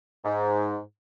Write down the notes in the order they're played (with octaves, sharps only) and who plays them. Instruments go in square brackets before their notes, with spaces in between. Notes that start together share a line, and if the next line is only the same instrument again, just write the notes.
[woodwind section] G#2